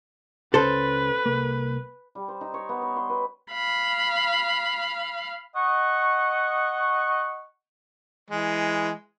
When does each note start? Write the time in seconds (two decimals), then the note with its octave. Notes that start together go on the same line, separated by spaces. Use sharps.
0.54 C#2 C#4 A4 B4 C5
1.26 C2 A#3
2.15 G3
2.28 C5
2.41 D#4
2.54 C#5
2.69 B3
2.82 C#5
2.96 C6
3.10 B4
3.51 F5 B5
5.55 D#5 F#5 C#6
8.31 E3 G#3